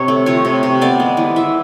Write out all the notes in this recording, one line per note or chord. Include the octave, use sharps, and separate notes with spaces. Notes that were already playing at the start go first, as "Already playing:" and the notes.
Already playing: C3 C#5
A3
F3 C#5
C3
C3
B3 D5
G#3
E3
E3 E5